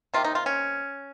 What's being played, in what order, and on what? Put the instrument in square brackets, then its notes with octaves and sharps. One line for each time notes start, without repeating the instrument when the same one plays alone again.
[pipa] C3 D#3 A#3 F4
D#4
F4
C#4